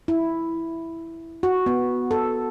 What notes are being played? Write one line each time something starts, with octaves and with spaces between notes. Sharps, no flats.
E4
F#4
B3
A4